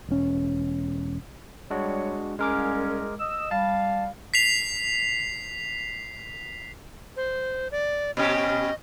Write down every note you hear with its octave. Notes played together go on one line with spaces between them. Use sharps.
E1 C#4
G3 G#3 D4 F#4 C#5
C2 G#3 C#4 A#4 D6
D#5 E6
G3 F5 A5
B6 C7 F7
C5
D5
B2 C#4 G4 D#5